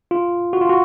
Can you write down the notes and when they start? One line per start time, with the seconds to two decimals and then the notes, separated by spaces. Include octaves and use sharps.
0.11 F4
0.53 F#4
0.61 F4
0.69 F#4